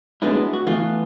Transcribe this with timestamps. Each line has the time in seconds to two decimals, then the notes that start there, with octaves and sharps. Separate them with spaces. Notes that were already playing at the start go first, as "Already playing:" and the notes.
0.22 F#3 G#3 A3 B3 D4 E4
0.53 F#4
0.67 E3 A3 B3 F4